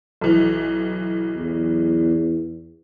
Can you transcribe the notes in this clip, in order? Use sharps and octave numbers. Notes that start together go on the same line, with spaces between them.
B1 E3
E2